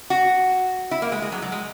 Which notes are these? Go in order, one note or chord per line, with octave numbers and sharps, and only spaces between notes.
F#4
E4
A#3
G#3
G#3
F#3
F#3
G#3